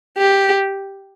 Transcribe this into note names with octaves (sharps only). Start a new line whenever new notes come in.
G4